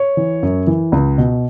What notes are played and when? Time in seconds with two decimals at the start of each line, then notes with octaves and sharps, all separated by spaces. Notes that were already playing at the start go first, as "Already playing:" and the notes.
Already playing: C#5
0.17 E3
0.43 F#2
0.67 E3
0.92 C#2
1.18 B2